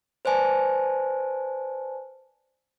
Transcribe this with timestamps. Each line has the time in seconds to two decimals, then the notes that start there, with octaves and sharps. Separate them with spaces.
0.25 B4 C5 D5 G#5 A5